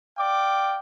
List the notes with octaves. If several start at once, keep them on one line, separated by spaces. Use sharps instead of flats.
D5 F5 G5 D6